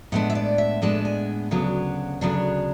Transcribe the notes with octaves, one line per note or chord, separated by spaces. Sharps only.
A2 G#3 B3 D4 F#5
E5
D5
E5
A2 G#3 B3 D4 A5
G#5
D2 C#3 F#3 B3 D4
D2 C#3 F#3 B3 D4